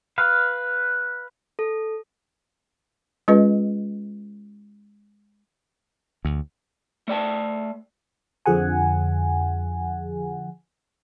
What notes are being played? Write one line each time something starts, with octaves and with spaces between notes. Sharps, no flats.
B4 F5
A4
G#3 C#4 F4 G#4 B4 D#5
D2
A3 D5 G5 A5
F2 D3 F3 G#4 F#5 G#5